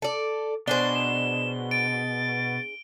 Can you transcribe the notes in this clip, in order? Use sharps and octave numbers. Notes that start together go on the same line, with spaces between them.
A4 D5
B2 D4 G#4 C5 A6 G7
E7
A6 D7